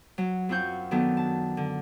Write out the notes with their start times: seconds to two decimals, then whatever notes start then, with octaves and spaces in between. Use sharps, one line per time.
0.18 F#3
0.49 F#2 C4 F4 F#5 C#6 G6
0.91 D#3 F#3 B3 D4 A4
1.17 A5
1.57 D3